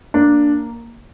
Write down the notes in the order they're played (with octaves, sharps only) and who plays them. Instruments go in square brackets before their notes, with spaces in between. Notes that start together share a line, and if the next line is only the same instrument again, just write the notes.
[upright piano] A#3 D4